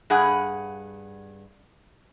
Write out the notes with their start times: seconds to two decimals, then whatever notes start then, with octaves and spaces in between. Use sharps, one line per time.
0.10 G2 G#4 F#5